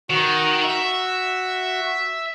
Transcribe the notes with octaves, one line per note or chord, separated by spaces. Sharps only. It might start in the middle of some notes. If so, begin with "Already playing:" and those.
D#3 F#4
E5